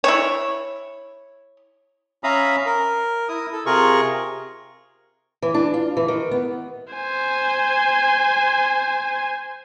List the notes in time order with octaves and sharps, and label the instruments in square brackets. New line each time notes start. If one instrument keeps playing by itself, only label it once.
[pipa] E4 C#5
[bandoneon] C#4 E5 F5 A#5 B5 D#6
A#4
E4 D#6
A4
C3 F4 G#4 A#4 C#6
[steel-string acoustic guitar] E3
D4
F4
E3
D#3
B3
[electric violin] C5 G#5